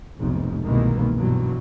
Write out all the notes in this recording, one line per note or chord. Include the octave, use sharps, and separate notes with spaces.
F1 B1 G#2
C2 G#2 B2 D#3 E3 A#3
G2 B2 E3 F#3